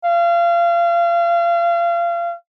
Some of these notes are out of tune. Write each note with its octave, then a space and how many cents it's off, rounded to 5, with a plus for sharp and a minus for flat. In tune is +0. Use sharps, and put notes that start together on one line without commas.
F5 -30